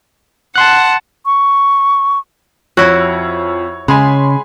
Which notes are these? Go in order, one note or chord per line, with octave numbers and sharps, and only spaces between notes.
F#5 A5 C6 F#6
C#6
F2 E4 F#4 C#5
C#3 G#3 G#5 B5 C6